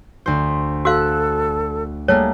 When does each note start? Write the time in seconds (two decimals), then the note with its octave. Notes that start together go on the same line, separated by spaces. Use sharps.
0.26 D2 C5
0.85 F#4 A4 F5 E6 F#6
2.08 G3 A3 A#3 G#4 C#5